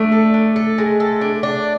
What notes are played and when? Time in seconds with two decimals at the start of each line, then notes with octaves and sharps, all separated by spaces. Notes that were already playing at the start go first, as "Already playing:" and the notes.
Already playing: A3 D4
0.12 A4
0.34 D4
0.56 A4
0.78 G#3
1.00 A4
1.21 D4
1.43 D4